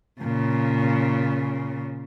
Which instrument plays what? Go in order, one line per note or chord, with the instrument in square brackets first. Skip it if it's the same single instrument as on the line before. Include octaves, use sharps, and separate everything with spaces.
[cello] A#2 C#3